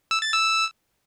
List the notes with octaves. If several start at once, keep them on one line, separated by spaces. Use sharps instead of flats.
E6
A6
E6